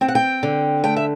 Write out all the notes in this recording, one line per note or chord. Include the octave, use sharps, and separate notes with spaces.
C4 G5
F#5
G5
D3
A3 G5
E5